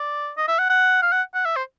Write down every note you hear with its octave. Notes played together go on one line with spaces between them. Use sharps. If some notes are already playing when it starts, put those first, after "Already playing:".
Already playing: D5
D#5
E5
F#5
F#5
F5
F#5
F#5
E5
C5